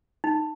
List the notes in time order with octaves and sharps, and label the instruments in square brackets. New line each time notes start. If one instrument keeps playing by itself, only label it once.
[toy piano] D#4